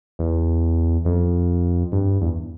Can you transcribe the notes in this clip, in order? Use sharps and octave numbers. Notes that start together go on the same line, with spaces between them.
E2
F2
G2
E2